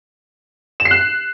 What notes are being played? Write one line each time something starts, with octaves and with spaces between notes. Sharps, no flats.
E7
C7
F#6